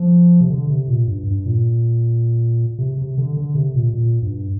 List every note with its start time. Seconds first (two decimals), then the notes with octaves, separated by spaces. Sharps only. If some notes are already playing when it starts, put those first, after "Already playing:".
Already playing: F3
0.41 C3
0.50 D3
0.70 C3
0.88 A#2
1.08 G2
1.27 G2
1.46 A#2
2.79 C3
2.98 C3
3.18 D3
3.37 D3
3.55 C3
3.75 A#2
3.94 A#2
4.22 G2